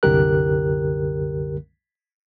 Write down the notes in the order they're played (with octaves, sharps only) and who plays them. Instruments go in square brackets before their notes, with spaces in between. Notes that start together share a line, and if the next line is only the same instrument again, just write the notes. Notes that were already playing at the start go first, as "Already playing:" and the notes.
[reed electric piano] C2 F#2 D3 G4 A#4 F#6